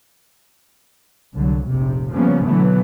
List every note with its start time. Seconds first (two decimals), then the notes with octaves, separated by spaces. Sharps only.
1.33 C2 D3 F#3
1.67 F1 A#1 C3
2.13 C#3 F3 G3 A#3 B3 C#4
2.44 B2 D3 E3 F#3 A3 B3